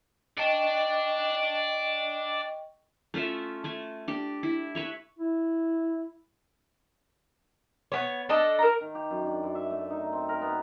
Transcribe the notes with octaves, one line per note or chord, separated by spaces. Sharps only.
D5 D#5 G5 A5 C#6
A3 C#4 F4 E5
A3 G#5
D4 G4
E4
B4 C#5 E5
E4
B3 C#5
D4 A4 D#5
A#4 A#5
D#3
G4
F#2
D4
F#2
E5
A3
D#4
C4
A#4
B3